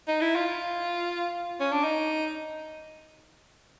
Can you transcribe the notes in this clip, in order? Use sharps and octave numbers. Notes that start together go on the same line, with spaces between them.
D#4
E4
F4
C#4
D4
D#4